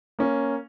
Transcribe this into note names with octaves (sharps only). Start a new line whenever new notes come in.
A#3 C#4